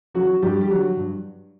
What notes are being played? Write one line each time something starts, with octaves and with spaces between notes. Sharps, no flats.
C#3 E3 F#3 F#4
G2 G3 G4
G4
D3 F#3 F#4
G2